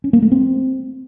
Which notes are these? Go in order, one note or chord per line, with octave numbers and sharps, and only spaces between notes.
C#4
A#3
A3
C4